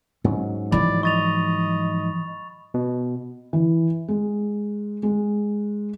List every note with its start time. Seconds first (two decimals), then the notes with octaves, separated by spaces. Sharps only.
0.24 G#2 F#3 C#4
0.72 E3 F3 D5 B5
1.03 D#5 C#6 A6 F7
2.74 B2
3.53 E3
4.08 G#3
5.03 G#3